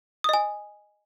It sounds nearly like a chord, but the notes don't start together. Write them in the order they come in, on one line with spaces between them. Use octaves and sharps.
D#6 D#5 G#5